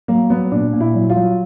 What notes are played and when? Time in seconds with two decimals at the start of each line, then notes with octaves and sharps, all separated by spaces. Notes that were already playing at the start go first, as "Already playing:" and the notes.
0.08 F#3 A#3
0.30 F#3 B3
0.51 A#2 D4
0.73 A#2
0.80 E4
0.95 F#3
1.10 F4
1.16 F#3